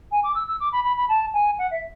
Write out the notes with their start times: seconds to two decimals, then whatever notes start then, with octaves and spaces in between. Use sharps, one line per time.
0.12 G#5
0.23 D6
0.35 E6
0.48 E6
0.60 D6
0.72 B5
0.84 B5
0.97 B5
1.09 A5
1.34 G#5
1.59 F#5
1.71 E5